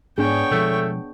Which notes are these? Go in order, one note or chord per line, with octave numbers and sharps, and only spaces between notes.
G#2 B3 D4 G#4 C#5 G5
B2 F3 G#3 A3